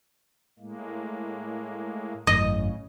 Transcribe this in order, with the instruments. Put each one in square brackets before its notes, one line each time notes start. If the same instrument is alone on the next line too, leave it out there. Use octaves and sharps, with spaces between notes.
[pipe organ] A2 G#3 A#3
[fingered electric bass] G#1 F#2 A2 [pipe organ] C#3 [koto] D#5